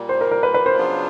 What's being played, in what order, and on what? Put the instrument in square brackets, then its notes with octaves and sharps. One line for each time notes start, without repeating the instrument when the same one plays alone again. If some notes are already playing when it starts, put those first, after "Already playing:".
Already playing: [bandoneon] A#2 G3 A#3
[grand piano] C5
A#4
A#4
B4
B4
C5
[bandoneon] C#3 F#3 B3 D4 F4